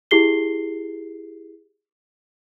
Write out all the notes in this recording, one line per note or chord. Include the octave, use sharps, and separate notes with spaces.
E4 G4 G#4 C7 G7